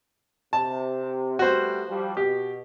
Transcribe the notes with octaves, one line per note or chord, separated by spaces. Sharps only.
C3 A5
G3 A3 B3 F#4 C5
F3 G3
B2 G4